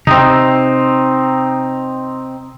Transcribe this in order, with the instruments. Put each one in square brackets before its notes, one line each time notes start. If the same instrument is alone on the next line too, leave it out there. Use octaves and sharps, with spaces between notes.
[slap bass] C3 [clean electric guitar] C4 D#4